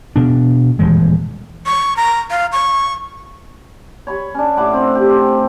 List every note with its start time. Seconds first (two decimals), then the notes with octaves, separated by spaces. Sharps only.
0.16 B2 D4
0.79 D#1 G2 E3 G#3
1.66 C#6
1.97 A#5
2.31 F5
2.52 C#6
4.07 C#5 B5 C#6
4.35 C#4 D4
4.57 A2 F#5 B5 D6
4.73 C4
4.95 G4
5.09 C4